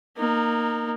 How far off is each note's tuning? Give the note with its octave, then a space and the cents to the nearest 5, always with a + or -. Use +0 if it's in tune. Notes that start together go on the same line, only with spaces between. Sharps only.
A#3 +0 D#4 -25